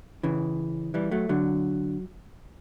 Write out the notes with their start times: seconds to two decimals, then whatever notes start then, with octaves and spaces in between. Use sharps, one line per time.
0.23 C#3 E3
0.94 E3 G3
1.11 F#3 A3
1.29 D3 F#3